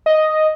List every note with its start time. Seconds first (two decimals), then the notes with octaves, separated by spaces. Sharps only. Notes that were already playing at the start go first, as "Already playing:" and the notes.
0.06 D#5